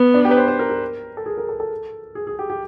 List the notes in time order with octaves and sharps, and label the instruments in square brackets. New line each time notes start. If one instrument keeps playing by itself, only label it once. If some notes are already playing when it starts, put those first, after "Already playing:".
Already playing: [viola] B3
[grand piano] D4
G4
B4
C5
C5
A#4
A#4
A4
G#4
A#4
A4
A4
G#4
G#4
G4
G4